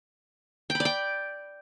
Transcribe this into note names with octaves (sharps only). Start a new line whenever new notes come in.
G5
B5
D5
G5